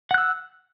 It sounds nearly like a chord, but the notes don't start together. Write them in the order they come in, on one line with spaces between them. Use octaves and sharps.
F#5 F#6 E6